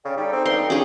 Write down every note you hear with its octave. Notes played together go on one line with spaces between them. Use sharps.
C#3 A4 D5 G5
G3 D#4 A4 G5
C4
G2 C6
G2 C#4 G#4